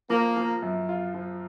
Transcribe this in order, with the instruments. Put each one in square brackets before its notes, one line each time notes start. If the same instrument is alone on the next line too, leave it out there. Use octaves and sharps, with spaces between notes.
[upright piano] F3 [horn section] A#3
[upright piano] F3
F#2
F4
F3